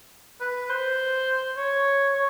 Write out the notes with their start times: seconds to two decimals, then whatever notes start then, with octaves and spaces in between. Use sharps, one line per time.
0.40 B4
0.69 C5
1.57 C#5
2.14 C#5